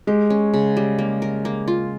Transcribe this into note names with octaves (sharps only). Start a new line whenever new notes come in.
G#3 G4
C#4
C#3
G3
A#3
A#4
A#3
F4